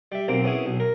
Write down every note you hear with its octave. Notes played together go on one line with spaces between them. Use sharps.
G3 E5
B1 A#3 C4
B3 C#4 E4 G#4
B1
A#4